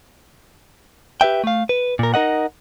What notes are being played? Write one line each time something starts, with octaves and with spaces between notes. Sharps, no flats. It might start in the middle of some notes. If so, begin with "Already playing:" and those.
G4 B4 E5 G5
A3 F5
B4
A#2 A#4
D#4 A#4 D#5 F#5